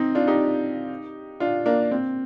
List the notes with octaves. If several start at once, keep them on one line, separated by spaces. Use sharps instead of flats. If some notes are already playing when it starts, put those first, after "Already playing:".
Already playing: C4 D#4
D4 F4
D#4 G4
D4 F4
A#3 D4
C4